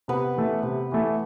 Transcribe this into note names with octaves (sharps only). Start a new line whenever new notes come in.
C3 B3 B4
E3 A3
C3
E3 A3